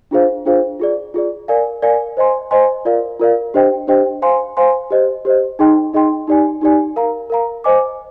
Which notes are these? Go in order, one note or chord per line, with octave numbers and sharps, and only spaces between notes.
D4 F4 G#4 C5 F5
D4 F4 G#4 C5 F5
F4 G#4 D5
F4 G#4 D5
A#4 D5 F5 G#5
A#4 D5 F5 G#5
C5 D#5 G#5 C6
C5 D#5 G#5 C6
F4 A#4 D5 F5
F4 A#4 D5 F5
D4 G4 C5 D#5 G5
D4 G4 C5 D#5 G5
C5 F5 G#5 C6
C5 F5 G#5 C6
G4 C5 D#5
G4 C5 D#5
D#4 G#4 D#5 G5 C6
D#4 G#4 D#5 G5 C6
D#4 G4 D5 G#5
D#4 G4 D5 G#5
A#4 F5 A#5
A#4 F5 A#5
C5 D#5 G#5 D6